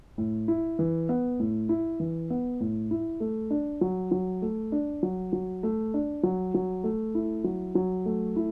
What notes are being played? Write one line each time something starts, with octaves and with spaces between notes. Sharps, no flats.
A2
E4
E3
B3
A2
E4
E3
B3
A2
E4
A3
D4
F#3
F#3
A3
D4
F#3
F#3
A3
D4
F#3
F#3
A3
E4
F#3
F#3
A3
E4